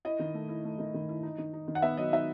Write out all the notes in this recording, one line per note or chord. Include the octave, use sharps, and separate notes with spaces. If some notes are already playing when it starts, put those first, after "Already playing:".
E4 D#5
D#3
A3
E4
A3
D#3
D#3
E4
D#4
D#3
D#4
D#3
F#5
B3 E5
F#3 D#5
D#4 E5